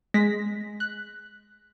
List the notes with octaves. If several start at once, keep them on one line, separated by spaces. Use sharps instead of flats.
G#3 A#6 B6
F#6